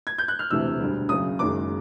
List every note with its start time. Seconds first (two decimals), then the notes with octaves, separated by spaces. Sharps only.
0.07 G#6
0.18 G6
0.28 F#6
0.39 F6
0.50 E1 D2 C3 E3 A3 E6
0.80 E1 D2 D3 G3
1.09 F#1 F#2 C#3 D#6
1.39 F#1 F#2 D#3 G#3 D6